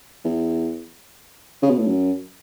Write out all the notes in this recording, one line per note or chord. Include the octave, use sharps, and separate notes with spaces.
E2
C#3
B2
A2
F#2